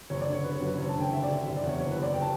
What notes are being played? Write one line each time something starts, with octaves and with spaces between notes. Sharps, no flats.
F#1 C#5
D5
D3
C#5
D3 B4
C#5
F#2
B4
F#1 C#5
A5
D3
G5
F#1 E5
D5
D3
F#1 E5
D5
E2
C#5
F#1 C#5
B4
F#1
D5
G5
A5